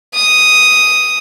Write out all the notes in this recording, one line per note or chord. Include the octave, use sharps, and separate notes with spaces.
D#6